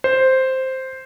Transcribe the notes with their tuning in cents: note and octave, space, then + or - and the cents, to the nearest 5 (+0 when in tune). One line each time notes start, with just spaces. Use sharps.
C5 +0